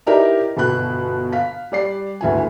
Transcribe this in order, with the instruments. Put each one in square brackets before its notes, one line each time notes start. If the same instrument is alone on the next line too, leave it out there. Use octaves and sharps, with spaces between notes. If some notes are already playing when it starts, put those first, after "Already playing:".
[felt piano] D#4 E4 G4 A#4 B4 D5
G1 B2 B5 F#6
F5 B6
G3 D5 C7
G1 D2 E4 G#5